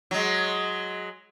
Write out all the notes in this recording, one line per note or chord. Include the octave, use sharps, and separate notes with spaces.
F#3 G#3